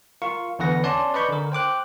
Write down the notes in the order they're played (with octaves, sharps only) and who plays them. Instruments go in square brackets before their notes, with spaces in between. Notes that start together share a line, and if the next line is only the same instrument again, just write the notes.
[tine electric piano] F4 A#4 F5 C#6
E2 D3 B4 F#5 A#6
C#4 D5 A5 C6
B4 D5 D#5 B5 C#6 G6
D3 A#4
C5 G5 D6 F#6